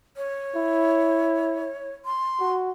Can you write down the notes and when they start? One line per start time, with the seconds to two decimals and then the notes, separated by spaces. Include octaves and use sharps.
0.17 C#5
0.56 E4
2.05 C6
2.40 F#4